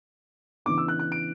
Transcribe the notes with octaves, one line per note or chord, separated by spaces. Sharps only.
C#3 E3 B3 D4 D6
E6
F#6
F#6
D7